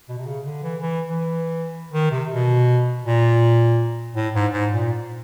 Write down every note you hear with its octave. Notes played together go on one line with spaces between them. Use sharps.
B2
C3
C#3
D3
E3
E3
E3
D#3
C3
B2
A#2
A2
G#2
G#2
A#2